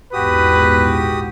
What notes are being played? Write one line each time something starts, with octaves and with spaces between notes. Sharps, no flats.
A#1 E2 G#2 F#4 G4 B4 D#6